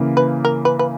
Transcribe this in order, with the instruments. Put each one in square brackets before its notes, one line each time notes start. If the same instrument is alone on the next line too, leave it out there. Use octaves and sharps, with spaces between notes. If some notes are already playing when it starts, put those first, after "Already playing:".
Already playing: [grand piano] C#3 E3 A#3
[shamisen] B4
A#4
B4
B4